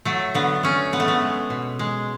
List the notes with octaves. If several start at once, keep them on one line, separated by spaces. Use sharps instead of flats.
F#3 A3
D3 B3
A3 C#4
G#3 B3
A3
B3
G#3
B2
G#3